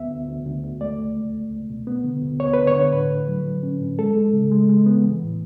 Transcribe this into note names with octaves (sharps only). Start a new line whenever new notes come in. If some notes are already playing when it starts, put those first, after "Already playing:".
Already playing: D2 B3 E5
D2
D2
D2
D2
A3 D5
C#2
A3
C#2
C#2
B2
B3
D3
D2
B3 C#5
D3 B4
C#5
D3
A2 B4
A2
F#3
F#3
C#4
A2
G#3 A4
G#3
C#3
G#3
G#3
B3
E3
A2